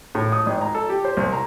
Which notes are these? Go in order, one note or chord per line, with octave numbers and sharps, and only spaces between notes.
A2
D#6
G#1
A#5
A4
G4
C5
C2
A#5